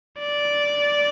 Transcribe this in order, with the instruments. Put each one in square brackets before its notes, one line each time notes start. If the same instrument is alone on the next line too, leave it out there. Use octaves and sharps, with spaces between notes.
[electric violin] D5